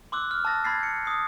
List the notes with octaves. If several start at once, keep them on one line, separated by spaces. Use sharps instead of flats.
C6 D6 E6 F#6
F6
A5 D6 E6 A6 A#6
B5 F6 G#6 A6 B6 C7
G6 C#7
D#6 C7